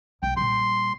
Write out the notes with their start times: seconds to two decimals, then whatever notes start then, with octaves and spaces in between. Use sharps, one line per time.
0.23 B1 G5
0.37 A#1 G3 C6